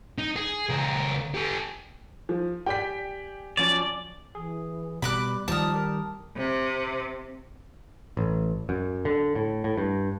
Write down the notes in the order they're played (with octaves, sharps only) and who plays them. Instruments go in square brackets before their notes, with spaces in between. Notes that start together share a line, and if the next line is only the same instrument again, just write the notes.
[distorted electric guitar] D#4
G#4
C#2 A#4
G4 A4
[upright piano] F3
[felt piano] G4 D5 G#5 [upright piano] G5 B6
[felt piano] F3 F#3 C#4 [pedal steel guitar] D5
[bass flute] E3 [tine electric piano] G#4
[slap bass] B2 [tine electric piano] G3 [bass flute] D5 [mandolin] B5 D6 F#6
[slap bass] D#3 G3 [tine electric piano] F3 D#4 F6 [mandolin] A5 D#6
[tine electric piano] G4 A#4
[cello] C3
[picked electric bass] A1
F#2
D3
A2
A2
G2